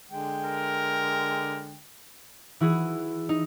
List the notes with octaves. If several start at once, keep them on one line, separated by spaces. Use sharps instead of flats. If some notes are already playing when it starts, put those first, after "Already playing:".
D3 G#3 G5
A#4
E3 E4 F#4 G#4
D#4